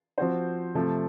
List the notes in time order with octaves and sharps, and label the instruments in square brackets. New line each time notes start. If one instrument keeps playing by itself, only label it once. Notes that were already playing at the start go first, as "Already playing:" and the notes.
[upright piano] F3 C4 F#4 C5
C3 F3 A3